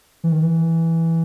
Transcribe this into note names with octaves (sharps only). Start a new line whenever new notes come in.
E3
D#3
E3